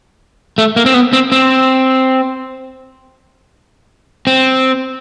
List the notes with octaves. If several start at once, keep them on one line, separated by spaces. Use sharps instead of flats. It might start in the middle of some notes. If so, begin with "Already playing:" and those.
A3
A#3
C4
B3
C4
C4
C4